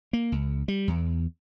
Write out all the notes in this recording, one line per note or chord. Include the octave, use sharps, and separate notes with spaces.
A#3
C#2
G3
E2